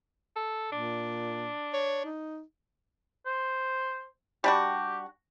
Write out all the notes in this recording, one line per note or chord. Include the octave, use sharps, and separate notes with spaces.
A4
A#2 D4
C#5
D#4
C5
G3 D4 F#4 G4